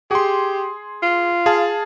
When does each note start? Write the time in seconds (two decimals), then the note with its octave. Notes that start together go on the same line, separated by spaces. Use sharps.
0.11 G4 G#4 C6
1.03 F4
1.46 G#4 F5 A5